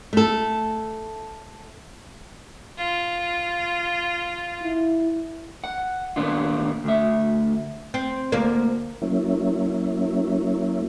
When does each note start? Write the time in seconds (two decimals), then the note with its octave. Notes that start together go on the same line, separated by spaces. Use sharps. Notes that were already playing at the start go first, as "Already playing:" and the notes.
0.13 A3 A4
2.78 F4
4.63 E4
5.64 F#5
6.16 D#2 A#2 B3 D4 F4
6.84 D2 E5
7.94 C4
8.32 D2 A#3
9.02 F#3 A#3 C#4 E4